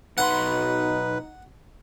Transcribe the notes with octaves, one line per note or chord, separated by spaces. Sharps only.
B1 D#4 B4 F#5 C6